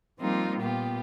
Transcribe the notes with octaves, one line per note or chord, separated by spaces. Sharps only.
F3 G3 A#3 C4 D#4 F4
A#2 B3 F4 G4